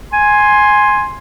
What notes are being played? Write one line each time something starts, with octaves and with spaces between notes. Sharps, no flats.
G#5 C6